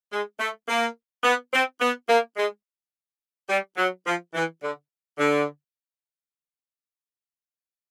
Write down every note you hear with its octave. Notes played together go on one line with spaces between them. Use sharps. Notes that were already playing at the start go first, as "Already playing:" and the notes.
G#3
A3
A#3
B3
C4
B3
A#3
G#3
G3
F#3
F3
E3
D3
D3